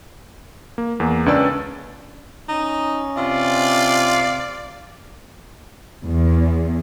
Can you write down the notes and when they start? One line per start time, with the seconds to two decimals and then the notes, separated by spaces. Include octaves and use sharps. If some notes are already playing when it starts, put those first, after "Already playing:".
0.78 A#3
1.00 E2 A#3
1.26 C#2 C#4 D4 B4 D5 E6
2.49 C#4 D#4
3.17 C3 F4 D5
6.05 E2